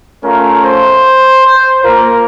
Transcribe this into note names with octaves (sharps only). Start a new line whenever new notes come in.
A3 C#4 F4 A#4
C5
C5
A#3 F4 A#4